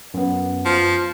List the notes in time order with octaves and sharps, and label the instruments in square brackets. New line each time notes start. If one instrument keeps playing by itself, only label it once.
[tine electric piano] F#2 B3
[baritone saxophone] F3